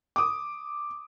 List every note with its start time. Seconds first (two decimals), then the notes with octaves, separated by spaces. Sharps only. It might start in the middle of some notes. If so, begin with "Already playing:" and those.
0.16 D6 D#6